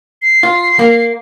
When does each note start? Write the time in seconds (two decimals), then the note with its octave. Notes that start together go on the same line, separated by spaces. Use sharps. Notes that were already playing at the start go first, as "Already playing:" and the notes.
0.22 C7
0.43 F4
0.79 A#3